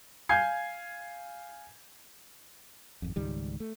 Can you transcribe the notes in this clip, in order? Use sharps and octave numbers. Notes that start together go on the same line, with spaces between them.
F5 G#5 G6 G#6 C7
G#1 F2
C#2 G#2 D#3 G3
A3